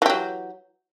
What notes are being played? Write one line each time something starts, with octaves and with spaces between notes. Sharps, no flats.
E3 F#3 G4